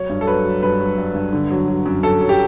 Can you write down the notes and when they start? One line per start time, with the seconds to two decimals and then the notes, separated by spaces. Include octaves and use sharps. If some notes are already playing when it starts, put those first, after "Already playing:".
Already playing: F#3 C#5
0.10 G2
0.21 A4
0.27 F#3 B4
0.45 F#3
0.63 G2 B4
0.80 F#3
0.98 G2
1.15 G2
1.33 D3
1.50 F#3
1.68 F#3
1.86 F#2
2.03 F#3 A4
2.21 F#3
2.29 G4